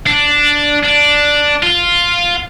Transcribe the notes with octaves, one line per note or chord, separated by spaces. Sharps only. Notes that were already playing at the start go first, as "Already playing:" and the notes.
D4
D4
F4